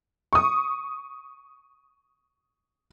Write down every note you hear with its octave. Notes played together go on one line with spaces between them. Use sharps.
C#6 D#6